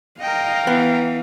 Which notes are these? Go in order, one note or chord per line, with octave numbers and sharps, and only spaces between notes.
A#4 D#5 F5 G5
E3 B3